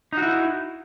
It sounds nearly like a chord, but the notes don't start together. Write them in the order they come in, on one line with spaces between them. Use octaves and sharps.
D#4 F#4 E4